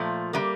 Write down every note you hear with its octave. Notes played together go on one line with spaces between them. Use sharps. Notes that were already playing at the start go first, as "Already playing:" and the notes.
Already playing: A#2 F3 A3
C3 G3 A#3